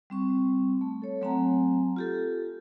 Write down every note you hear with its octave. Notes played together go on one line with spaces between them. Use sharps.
G3 C4 C#6
A3
A4 C#5
F#3 A3 C4 F#5 G#5 A#5
F4 G4 A4